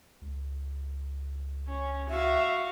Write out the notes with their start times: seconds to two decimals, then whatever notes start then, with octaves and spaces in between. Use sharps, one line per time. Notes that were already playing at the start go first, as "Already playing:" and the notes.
0.21 C#2
1.68 C#4
2.09 F#4 E5 F5